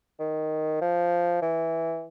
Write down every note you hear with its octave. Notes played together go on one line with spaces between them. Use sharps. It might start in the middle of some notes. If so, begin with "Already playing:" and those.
D#3
F3
E3